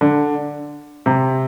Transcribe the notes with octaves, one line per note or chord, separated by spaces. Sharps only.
D3
C3